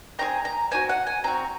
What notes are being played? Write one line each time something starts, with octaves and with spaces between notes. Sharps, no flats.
C4 F4 G#4 A#5
A#5
C4 D#4 F#4 G#5
F#5
G#5
C4 F#4 A#5